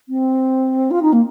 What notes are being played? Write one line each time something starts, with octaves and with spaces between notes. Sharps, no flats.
C4
F4
D#4
A#3